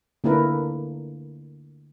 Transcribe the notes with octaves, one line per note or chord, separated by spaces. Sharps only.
D3 A#3 D4 E4 A#4 B4